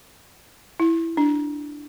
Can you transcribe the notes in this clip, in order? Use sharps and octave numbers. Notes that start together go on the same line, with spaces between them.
E4
D4